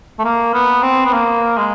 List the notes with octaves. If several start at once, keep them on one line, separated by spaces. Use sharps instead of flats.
A3
A#3
B3
C4
B3
A#3
G#3